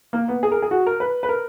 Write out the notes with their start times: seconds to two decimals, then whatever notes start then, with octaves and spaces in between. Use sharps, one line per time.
0.13 A#3
0.28 B3
0.43 G#4
0.52 A#4
0.62 G#4
0.71 F#4
0.87 A#4
1.00 B4
1.23 B4
1.29 A#4